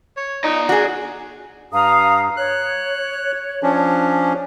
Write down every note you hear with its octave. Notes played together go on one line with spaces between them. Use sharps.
C#5
D#4 D5 A#5
D4 F#4 G#4
G2 F5 A#5 D#6
C#5 F#6
F3 C#4 D4